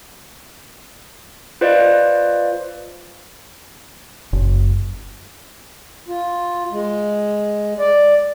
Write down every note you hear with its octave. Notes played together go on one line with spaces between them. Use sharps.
F4 B4 C5 D5 D#5 F5
F#1
F4
G#3
D5